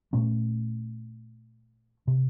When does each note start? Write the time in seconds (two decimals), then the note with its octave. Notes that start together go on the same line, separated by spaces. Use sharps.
0.13 A#2 A3 C#4
2.07 C3